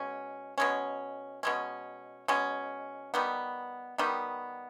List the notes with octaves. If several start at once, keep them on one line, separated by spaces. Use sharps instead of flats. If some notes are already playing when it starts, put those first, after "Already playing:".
Already playing: B2 G#3 C#4
B2 G#3 C#4
B2 G#3 C#4
B2 G#3 C#4
D#3 G3 B3
D#3 G3 B3